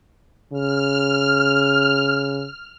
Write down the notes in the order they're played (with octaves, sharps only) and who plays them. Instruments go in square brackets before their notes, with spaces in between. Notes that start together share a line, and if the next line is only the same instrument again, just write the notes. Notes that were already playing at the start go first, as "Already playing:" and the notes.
[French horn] C#3 [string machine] F6